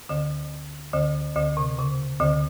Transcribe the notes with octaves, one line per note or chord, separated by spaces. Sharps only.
D2 D3
D2 D3
D2 D3
C3
C#3
D2 D3